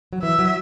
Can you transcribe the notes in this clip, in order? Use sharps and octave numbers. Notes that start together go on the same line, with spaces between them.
F#3
E3 E5
F#3